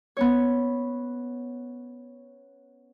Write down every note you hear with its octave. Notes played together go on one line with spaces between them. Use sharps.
B3 C#4 C#5